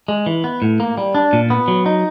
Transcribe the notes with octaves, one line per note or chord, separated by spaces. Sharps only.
G#3
E3
B3
A2
A#3
G3
D4
A#2
B3
F#3
D#4